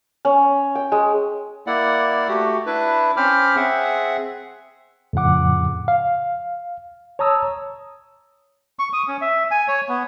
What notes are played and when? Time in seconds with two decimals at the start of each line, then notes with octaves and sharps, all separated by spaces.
0.25 C#4
0.75 G5
0.92 G#3
1.67 A#3 E4 D5 F#5
2.28 A3 F#4 G4
2.66 D4 E4 B4
3.17 C4 C#4 C5 B5 D6 F6
3.56 C4 G#4 E5 F#5
5.13 F2 A2 C#3 F3 F#5 D6
5.88 F5
7.19 C#5 A5 A#5 D#6 E6
8.79 C#6
8.93 D#6
9.08 C#4
9.22 E5
9.51 G#5
9.68 C#5
9.89 B3